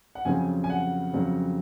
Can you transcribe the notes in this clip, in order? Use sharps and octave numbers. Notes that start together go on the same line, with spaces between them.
F#5
F2 C#3 F#3 C4 G#5
G#5
F#5
F2 C#3 F#3 C4